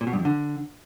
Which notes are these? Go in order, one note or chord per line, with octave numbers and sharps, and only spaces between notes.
A#2
B2
G2
F2
D3